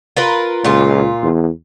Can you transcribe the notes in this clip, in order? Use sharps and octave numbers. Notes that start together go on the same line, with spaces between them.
F4 A#4 B4
C#2 A#2 F4
E2